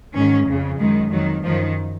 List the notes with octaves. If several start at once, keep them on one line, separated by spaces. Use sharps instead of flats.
G#2 D#3 C#4
F2 C#3
F#2 D#3 G#3
F2 D#3 F#3
F#2 D#3 F3